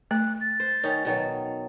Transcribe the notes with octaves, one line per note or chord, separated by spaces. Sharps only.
A3 F#6
A6
C5
D#3 C#4 D#4
B2 D#3 F#3